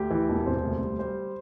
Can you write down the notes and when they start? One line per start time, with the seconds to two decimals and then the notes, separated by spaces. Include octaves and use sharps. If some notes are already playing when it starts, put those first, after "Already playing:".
Already playing: D2 G4
0.10 E3
0.29 E1
0.46 C3 C5
0.64 D2
0.81 G3
0.99 G3 C5